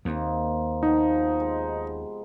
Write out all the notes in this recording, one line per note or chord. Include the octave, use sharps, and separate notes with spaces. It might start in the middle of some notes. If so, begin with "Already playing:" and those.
D#2 A#3 C4 D#4
C3 F3 B3 D#4
G#3